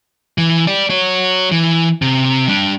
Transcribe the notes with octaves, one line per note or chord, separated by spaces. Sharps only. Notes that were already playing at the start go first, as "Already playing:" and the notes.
E3
G4 D5
F#4 C#5
E3
C3
G3 D4